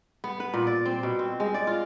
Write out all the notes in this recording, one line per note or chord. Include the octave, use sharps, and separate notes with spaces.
B3
B4
A#2
D5
C4
B2
C4
G#3
D5
F4